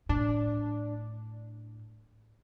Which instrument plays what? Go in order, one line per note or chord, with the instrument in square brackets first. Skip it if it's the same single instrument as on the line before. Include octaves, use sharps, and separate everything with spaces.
[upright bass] A2 [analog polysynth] D4